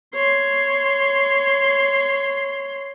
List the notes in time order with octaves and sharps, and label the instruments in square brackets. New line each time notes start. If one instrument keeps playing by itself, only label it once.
[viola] C#5 C6